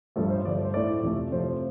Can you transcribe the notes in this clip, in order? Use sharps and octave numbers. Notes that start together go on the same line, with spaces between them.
G2 F3 A3 A4
C5
G2 D3 F3 A3 D5
C5
C5
A2 A3 D5
F2 C3 F3 A3
C3 F3 A3 C5